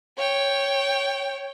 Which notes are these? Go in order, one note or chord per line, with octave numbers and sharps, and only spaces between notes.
C#5 G5